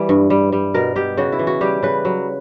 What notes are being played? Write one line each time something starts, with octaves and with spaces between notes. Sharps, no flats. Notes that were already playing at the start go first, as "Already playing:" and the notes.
Already playing: E3 G3
G2
G3
G3
B2 A#4
B2 G4
C#3 F#4
E4
E3
F#4
G3 G4
C#3 B4
F#3